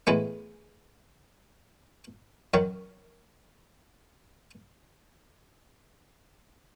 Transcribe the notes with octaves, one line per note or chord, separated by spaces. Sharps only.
A2 E3 G#3 B3
F#2 D#3 F#3